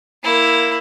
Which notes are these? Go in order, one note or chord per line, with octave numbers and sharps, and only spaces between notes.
A#3 E4